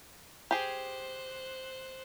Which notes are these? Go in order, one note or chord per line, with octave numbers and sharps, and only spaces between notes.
G4 G#4 C5 F#6